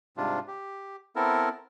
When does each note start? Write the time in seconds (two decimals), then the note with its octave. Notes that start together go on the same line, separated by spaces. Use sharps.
0.17 G#2 C3 G3 D4 F4
0.47 G4
1.16 B3 C4 E4 A4 A#4